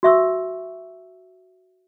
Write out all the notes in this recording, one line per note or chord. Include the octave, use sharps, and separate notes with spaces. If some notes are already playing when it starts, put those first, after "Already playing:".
F#4 E5 C#6 E6